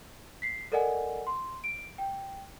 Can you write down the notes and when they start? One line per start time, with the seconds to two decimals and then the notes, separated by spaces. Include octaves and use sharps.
0.42 B6 C7
0.72 A4 A#4 D5 D#5 F#5 G#5
1.27 C6
1.64 D7
1.98 G5